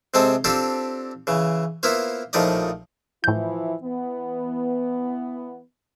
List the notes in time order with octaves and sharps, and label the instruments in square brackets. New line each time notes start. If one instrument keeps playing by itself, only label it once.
[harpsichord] C3 G#3 C4 A4 C5
C4 D4 F4 G4 A4 C5
C#3 E3
A#3 B3 E4 F4 C5
A#1 A2 F3 D#4 D5 D#5
[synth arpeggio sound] A2 G6 [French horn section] E3 F3 E4
[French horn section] E3 B3